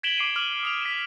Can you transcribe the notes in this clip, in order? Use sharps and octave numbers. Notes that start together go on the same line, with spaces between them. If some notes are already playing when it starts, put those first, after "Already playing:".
G#6 B6 D7 E7 F#7 G7
D6 C7 D7 D#7
D6 F6 F#7
D#6 D7 F7
B6 E7